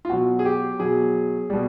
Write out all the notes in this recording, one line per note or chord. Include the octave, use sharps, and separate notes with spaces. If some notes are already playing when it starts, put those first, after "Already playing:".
F4
B2 F#3 F#4
G#4
G4
B2 F#3 G#4
B2 G3